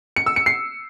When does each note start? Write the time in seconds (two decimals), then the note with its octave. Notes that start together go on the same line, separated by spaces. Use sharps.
0.16 C#7
0.26 E6
0.36 C#7
0.46 C7